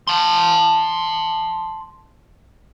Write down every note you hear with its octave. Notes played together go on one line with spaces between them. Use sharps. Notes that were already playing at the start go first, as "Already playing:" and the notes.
A5 C6